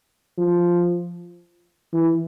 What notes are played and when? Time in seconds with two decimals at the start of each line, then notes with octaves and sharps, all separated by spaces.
0.38 F3
1.93 E3